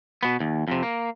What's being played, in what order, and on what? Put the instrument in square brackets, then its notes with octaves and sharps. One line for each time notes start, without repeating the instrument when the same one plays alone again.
[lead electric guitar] B2 B3
D#2
F2 C3
A#3